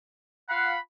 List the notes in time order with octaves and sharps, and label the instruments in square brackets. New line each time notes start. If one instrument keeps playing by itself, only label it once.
[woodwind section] F4 F5 F#5 [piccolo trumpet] B5